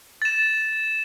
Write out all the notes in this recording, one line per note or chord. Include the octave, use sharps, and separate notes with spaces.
A6 E7